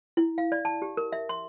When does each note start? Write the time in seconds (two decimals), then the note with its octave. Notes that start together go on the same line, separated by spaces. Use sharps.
0.17 E4
0.38 F5
0.52 D5
0.65 A5
0.82 G4
0.97 A#4
1.12 E5
1.29 C6